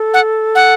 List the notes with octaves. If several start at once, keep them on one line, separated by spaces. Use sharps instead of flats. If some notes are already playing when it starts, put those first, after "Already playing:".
Already playing: A4
F#5
F#5